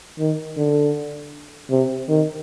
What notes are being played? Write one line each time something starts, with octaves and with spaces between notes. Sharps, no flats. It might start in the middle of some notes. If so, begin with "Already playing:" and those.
D#3
D3
C3
D#3